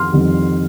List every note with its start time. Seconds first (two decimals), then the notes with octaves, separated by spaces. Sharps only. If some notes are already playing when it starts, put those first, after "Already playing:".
Already playing: F2 D#3 G3 C6 F6
0.12 F2 D#3 G3